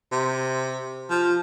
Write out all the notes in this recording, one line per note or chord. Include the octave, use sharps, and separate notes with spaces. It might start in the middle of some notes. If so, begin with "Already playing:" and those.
C3
F3